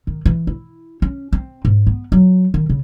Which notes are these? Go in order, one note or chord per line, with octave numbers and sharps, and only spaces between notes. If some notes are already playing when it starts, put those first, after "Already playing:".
D#3
E3
E4
C#4
C4
G#2
B3
F#3
D#3
C#3